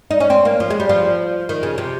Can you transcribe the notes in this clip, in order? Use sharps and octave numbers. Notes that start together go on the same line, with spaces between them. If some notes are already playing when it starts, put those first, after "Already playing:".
D#4
C#4
C4
A#3
F3
G#3
G3
F3
D#3
C#3
C3